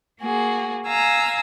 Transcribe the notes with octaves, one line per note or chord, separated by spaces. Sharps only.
A#3 F#4 G#4
F5 G#5 A#5 E6